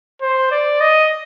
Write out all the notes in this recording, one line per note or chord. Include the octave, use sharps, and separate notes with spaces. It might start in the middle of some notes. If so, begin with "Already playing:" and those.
C5
D5
D#5